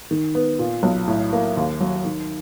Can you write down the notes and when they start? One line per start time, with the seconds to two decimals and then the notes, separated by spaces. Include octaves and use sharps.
0.11 D#3
0.35 B3
0.59 A#2
0.83 B1
1.08 A2
1.33 A#3
1.57 D#2
1.80 F#3
2.05 D#3